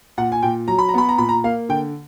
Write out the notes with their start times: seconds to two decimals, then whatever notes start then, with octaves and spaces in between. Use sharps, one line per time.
0.18 A#2 F#5
0.32 G#5
0.42 A#2 G5
0.68 F#3 A#5
0.78 B5
0.89 A#5
0.94 B3 B5
1.09 A#5
1.18 A#2 B5
1.29 A#5
1.44 A#3 F5
1.69 D3 G5